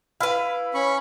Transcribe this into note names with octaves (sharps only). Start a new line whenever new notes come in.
E4 B4 F5
C#4 B5 C#6